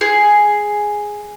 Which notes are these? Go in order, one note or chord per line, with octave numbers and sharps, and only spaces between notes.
G#4